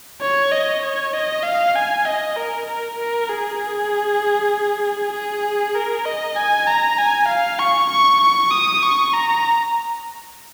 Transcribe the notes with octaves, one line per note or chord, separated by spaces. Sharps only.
C#5
D#5
C#5
D#5
F5
G#5
D#5
A#4
A#4
A#4
G#4
G#4
G#4
A#4
D#5
G#5
A#5
G#5
F5
C#6
C#6
C#6
D#6
C#6
A#5